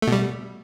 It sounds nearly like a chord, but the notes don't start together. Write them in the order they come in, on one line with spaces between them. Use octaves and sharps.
A3 B2 G3